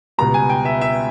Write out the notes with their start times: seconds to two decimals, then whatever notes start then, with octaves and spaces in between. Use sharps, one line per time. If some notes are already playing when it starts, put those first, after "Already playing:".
0.18 C#2 B2 G3 A#5
0.34 G#5
0.49 G5
0.65 E5
0.81 E5